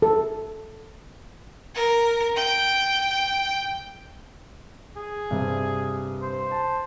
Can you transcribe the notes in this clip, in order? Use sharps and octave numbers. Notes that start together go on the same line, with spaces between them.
A4
A#4
G5
G#4
G2 C3
C5
A5